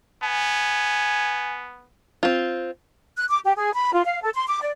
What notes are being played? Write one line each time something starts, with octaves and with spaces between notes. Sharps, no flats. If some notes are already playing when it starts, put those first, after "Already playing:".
B3 G#5
C4 F4
F#6
D6
G4
G#4
B5
F4
F5
A4
C6
D6
D5